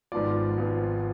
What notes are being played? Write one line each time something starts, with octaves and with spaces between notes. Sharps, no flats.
G#1 G#2 F3 B3 F4 D5 D6
G#1 G#2 F3 B3 F4